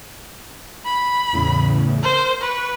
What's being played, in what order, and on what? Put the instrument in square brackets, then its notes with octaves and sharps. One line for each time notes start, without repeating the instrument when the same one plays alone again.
[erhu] B5
[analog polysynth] E2 A2 C#3
[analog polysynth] A#4 [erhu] C5
[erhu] B4 [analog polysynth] C#6